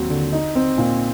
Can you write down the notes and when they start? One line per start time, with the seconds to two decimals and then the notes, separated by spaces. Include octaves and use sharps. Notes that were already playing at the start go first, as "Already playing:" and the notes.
Already playing: D#2 F#3 C4
0.10 D3
0.33 D#4
0.55 C4
0.78 A#2